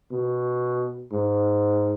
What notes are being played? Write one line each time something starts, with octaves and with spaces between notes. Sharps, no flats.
B2
G#2